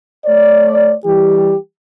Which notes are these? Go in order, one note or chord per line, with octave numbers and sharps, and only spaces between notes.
A3 C#5 D5
E3 G3 G4